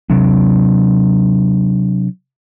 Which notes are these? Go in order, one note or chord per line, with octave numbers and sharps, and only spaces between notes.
C3 F#3 C4 D4